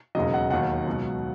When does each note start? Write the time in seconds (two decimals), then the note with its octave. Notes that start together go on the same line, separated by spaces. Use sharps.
0.15 E1 D#2 C#3 F#3 D#5
0.34 F#5
0.50 E1 D#2 D#3 F#3 F#5
0.87 C#2 B2 F#3